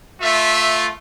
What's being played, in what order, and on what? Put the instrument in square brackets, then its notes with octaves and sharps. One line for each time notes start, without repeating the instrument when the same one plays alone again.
[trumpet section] A3 F4 E5